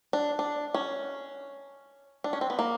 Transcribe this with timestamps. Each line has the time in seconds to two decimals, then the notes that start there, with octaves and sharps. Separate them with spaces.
0.13 D4
0.39 D4
0.74 C#4
2.24 D4
2.33 C#4
2.41 C4
2.50 B3
2.59 A#3